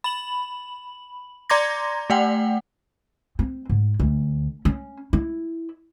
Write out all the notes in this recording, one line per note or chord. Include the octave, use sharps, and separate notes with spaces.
B5 F#7
D5 A#5 C6 D6 G#6 A#6
A3 D5 F#5 G5
C4
G#2
D2
C#4
E4